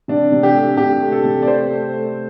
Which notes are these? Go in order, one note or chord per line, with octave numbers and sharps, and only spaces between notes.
C3 D4
C3
G4
A3
C3 G4
A3
A4
C3
D5
A3 C5
A3
A3